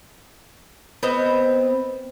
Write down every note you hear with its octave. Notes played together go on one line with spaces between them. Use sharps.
B3 C4 D#5